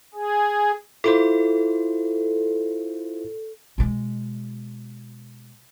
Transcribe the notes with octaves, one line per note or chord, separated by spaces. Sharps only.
G#4
E4 F4 A4 C5
B2 G#3